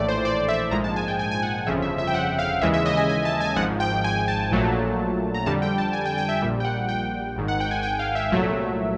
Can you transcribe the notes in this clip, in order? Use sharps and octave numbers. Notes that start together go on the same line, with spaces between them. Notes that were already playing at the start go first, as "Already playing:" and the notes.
Already playing: A#1 A2 E3 A3 D5
C5
D5
E5
E5
A#1 G#2 F3 G#3 A#5
A5
G#5
G5
G#5
G#5
F#5
G1 F2 C#3 F3 E5
E5
E5
G5
F#5
F5
D#2 C#3 E3 G#3 E5
E5
D#5
G#5
G#5
A5
G#5
G#1 G#2 F3 F#5
G5
G#5
A5
A#1 A#2 F#3 A3
A#5
F2 D3 G3 A5
G5
A5
G#5
G5
G5
E5
A#1 A#2 G3 E5
G5
F#5
G5
G#1 G#2 D#3
F#5
G5
G#5
G5
F5
E5
C2 A#2 F#3 A3